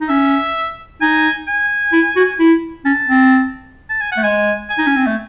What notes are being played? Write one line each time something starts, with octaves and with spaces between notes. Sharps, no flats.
D#4
C#4 E5
D#4 G#5
G#5
E4
F#4
E4
C#4 A5
C4
A5
G#5
F#5
A3
G#3 G#5
G#5
D#4
C#4
C4
A3